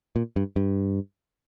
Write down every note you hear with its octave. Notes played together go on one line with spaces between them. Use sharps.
A#2
G2
G2